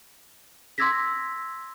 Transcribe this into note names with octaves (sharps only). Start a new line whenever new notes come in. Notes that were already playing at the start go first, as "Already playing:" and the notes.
C6 D6 E6 G#6 A#6 B6